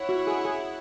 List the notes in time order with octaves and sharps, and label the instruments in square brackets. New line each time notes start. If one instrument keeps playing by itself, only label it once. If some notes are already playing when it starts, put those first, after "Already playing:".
Already playing: [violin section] E4 C#5 F#5
[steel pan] F#4
G#4
G#4